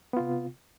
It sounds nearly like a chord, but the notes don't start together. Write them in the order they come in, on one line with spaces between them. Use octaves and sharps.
B3 F4 C3